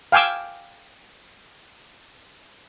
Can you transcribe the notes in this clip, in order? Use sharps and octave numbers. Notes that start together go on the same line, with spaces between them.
F5 G5 G#5 D6 E6